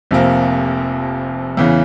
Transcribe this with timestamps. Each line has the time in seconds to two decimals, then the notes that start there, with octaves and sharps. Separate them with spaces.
0.11 F1 F2 C3 F3 A#3
1.57 E2 C#3 E3